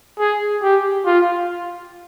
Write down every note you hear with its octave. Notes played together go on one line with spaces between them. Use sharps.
G#4
G4
F4